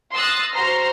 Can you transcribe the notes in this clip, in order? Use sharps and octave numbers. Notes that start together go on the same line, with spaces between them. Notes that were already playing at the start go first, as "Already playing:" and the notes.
C6 D#6 E6 F#6 A6 A#6
F#4 C5 A#5 C6 F6